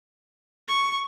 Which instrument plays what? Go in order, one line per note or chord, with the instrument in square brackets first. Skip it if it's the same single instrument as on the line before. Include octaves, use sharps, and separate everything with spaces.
[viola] C#6